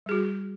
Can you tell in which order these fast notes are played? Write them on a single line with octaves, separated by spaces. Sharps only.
G3 G#4 F#4